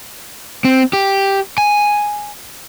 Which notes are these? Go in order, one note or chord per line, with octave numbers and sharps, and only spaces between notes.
C4
G4
G#5